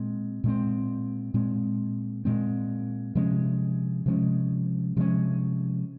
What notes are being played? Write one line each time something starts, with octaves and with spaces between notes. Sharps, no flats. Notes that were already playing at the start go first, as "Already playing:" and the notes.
Already playing: A#2 G#3 C4
A#2 G#3 C4
A#2 G#3 C4
A#2 G#3 C4
C3 F3 G#3 C#4
C3 F3 G#3 C#4
C3 F3 G#3 C#4